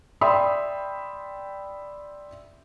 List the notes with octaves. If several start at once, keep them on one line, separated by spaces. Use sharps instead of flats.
D5 E5 G5 B5 C6 D#6